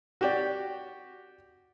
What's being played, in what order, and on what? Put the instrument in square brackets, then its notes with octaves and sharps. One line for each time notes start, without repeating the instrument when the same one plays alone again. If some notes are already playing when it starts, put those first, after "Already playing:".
[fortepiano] F#4 G4 D5